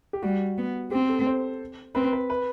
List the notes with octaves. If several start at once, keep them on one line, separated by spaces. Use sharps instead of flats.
G4
G3 F#4
B3
C4 G4
A4
C5
C4 B4
B4
B4